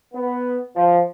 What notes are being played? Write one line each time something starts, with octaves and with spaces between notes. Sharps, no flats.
B3
F3